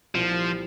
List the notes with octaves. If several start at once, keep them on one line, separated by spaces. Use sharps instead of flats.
C2 A#2 F3 G3 C4